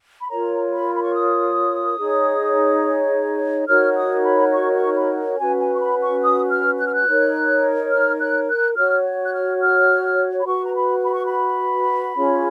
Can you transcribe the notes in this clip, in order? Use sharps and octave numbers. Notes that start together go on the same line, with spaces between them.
B5
F4 A#4 C#5 A#5
B5
B5
C#6
D#6
D#4 G#4 C#5
D#4 F#4 A#4 C#5 F6
D#6
B5
C#6
C#6
B5
C#4 F#4 B4 G#5
G#5
C#6
B5
C#6
D#6
F6
F#6
F6
F#6
D#4 A#4 C#5
F6
F#6
F#6
F#4 C#5 F6
F#6
F6
F6
B5
F#4 B4 C#6
A#5
B5
B5
C#6
B5
C#4 F4 G#4 C#5